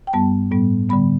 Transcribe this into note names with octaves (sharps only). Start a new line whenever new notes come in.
G5
G2 G3 B3 A5
A2 G3 B3
D3 G3 B3 B5